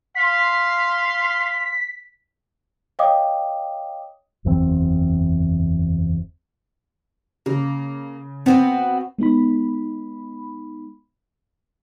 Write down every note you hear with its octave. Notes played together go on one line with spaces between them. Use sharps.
F5 C6 B6
C#5 D#5 F5 G5 D6 D#6
F#1 E2 C3 C4
C#3 A#3
B3 C4 F#4 B4
G#3 B3 D#4 B5